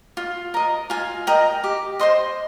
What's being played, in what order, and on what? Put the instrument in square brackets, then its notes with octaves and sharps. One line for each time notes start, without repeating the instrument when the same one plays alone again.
[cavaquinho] F4
A#4 D#5
F4 G#5
A#4 D#5 G5
G4
C5 D#5 C6